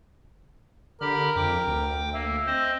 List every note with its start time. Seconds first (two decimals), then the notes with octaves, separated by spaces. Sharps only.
1.01 D3 G4 A#4 B5 F6
1.36 F2 G5 D6
1.67 D2
2.13 A#3 E5
2.47 C4 C5 D#5